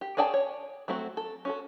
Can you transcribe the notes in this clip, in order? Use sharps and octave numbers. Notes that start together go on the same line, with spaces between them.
G4
C#4 G#4 D5 G5 A5
C#5
F#3 A3 C4 F#4
A4
C#4 F#4 A4